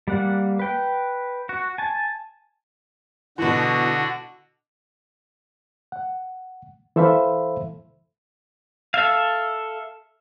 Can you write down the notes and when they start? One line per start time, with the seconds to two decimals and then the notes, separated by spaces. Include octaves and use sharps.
0.08 G3 A#3 F#5
0.59 B4 G5
1.49 F#4
1.78 G#5 A5
3.38 B2 D3 E3 F#4
5.92 F#5
6.96 E3 A4 C5 E5 F5 B5
8.94 A4 E5 F5